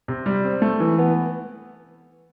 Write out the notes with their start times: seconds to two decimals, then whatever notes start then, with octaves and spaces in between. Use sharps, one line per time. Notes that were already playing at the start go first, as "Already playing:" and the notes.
0.08 C3
0.26 G3
0.44 C4
0.62 A3
0.80 E3
0.98 B3